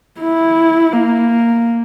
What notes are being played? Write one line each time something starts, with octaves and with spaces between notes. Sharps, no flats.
E4
A#3